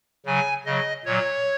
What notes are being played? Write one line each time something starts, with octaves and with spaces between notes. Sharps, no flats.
C#3 F#3 G#5
C#3 F#3 D#5
A#2 F#3 C#5